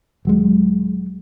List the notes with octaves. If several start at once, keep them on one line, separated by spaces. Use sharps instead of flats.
D#1 F#3 G#3